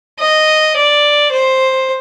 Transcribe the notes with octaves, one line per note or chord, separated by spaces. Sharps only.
D#5
D5
C5